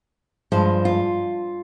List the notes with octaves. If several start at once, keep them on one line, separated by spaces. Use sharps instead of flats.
G2 F3 G#3 C5
F4